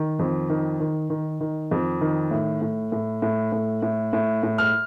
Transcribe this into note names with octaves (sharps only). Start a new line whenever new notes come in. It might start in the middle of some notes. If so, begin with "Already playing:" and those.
Already playing: D#3
F2
D#3
D#3
D#3
D#3
F2
D#3
A2
A2
A2
A2
A2
A2
A2
A2
F6